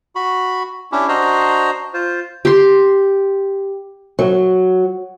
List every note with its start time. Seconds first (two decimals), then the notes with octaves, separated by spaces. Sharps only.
0.15 F#4 B5
0.92 C#4 D4 E4 G4
1.09 D4 F#4 C5 D#5 A#5
1.94 F4 C5
2.45 G4 C6
4.19 F#3